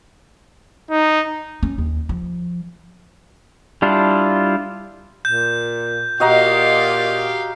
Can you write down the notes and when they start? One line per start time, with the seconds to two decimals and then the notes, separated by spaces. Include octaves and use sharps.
0.91 D#4
1.63 C#4
1.78 D#2
2.09 F3
3.82 G3 D4 E4 F4
5.25 A#2 G6
6.20 A#2 F#4 G4 D#5 F5 A#5